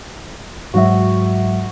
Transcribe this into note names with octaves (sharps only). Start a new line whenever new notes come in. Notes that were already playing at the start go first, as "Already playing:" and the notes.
G#2 F#3 F#4 E5